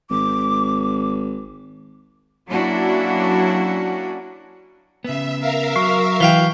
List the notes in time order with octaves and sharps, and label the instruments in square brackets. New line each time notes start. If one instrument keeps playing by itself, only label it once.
[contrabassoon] G#1 [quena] D6
[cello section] F#3 A#3 C#4 D4 E4 F#4
[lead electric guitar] C#3 B3 [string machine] E5
[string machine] A#4 E5 F5
[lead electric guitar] F#3 [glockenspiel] C#6 C7
[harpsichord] E3 F5 G5 [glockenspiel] G7